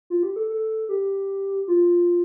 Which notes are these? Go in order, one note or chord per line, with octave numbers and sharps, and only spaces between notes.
F4
G4
A4
A4
G4
F4